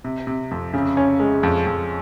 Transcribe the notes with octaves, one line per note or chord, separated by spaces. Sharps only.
C3
C3
F2
C#3
C#4
G#3
F2
F2